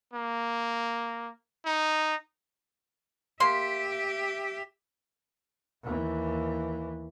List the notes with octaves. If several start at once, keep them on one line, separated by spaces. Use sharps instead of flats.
A#3
D#4
A#3 G4 E5 C6
D#2 E3